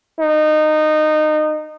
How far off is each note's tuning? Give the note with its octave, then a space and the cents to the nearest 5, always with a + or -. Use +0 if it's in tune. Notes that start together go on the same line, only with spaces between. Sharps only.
D#4 -20